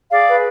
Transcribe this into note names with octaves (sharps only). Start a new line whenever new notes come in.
G#4 D5 F5
B4